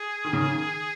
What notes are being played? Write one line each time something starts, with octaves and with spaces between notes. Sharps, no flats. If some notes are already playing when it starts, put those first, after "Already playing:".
Already playing: G#4
D#3
C#3
D#3